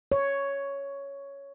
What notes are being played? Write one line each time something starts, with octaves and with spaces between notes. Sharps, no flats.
C#5